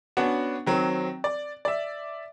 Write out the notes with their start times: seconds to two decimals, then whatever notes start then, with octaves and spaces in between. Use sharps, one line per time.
0.17 B3 C#4 D4 F#4
0.66 D#3 F#3 C4
1.24 D5
1.65 D5 E5